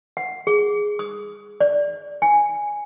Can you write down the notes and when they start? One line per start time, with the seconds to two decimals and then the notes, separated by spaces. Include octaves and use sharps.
0.17 F#5
0.47 G#4
0.99 D#6
1.61 D5
2.22 G#5